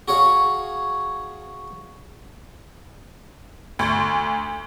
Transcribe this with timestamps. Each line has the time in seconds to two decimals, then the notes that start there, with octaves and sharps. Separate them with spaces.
0.08 F#4 G#4 C#5 F5
3.79 D2